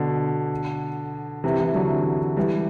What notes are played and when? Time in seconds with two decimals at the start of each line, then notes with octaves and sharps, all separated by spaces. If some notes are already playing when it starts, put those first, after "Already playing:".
Already playing: B2 D3
1.44 C3 E3
1.59 C3 E3
1.75 D3 F#3
2.37 E3 G3